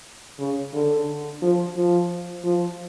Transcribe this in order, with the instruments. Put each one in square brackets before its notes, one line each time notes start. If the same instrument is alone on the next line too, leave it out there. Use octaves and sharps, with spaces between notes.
[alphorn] C#3
D3
F3
F3
F3